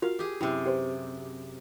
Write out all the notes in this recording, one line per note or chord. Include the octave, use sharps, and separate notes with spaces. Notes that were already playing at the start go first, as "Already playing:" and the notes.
F4 F#4 A#4 F5
G4 G#4
F#2 C3 E4 G5
G4 B4 C5